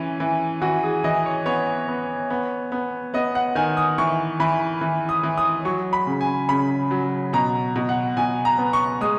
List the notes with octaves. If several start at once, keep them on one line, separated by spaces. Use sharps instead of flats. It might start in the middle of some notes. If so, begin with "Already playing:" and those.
Already playing: E3 C#4
E3
E3 F#4
G#4
E3 D#5
C#5
B3 C#5
B3
B3
B3
B3 D#5
F#5
D#3 G#5
D#6
E3 C#6
E3 B5
E3
D#6
E3
D#6
F#3 C#6
B5
C#3
G#5
C#3 B5
F#3
B2 A#5
B2
F#5
B2 G#5
A#5
B3
C#6
G#3 D#6